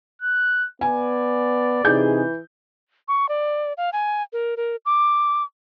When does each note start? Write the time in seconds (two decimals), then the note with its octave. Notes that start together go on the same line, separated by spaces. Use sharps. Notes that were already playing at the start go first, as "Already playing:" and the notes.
0.21 F#6
0.81 B3 D5 G#5
1.85 C3 E3 D#4 G#4 G6
3.08 C#6
3.29 D5
3.77 F5
3.93 G#5
4.33 A#4
4.57 A#4
4.86 D6